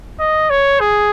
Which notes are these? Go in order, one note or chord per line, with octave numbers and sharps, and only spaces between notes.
D#5
C#5
G#4